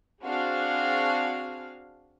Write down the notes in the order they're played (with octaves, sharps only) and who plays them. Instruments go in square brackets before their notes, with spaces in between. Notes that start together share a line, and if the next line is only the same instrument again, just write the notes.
[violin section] C4 D4 F#4 G#4 F5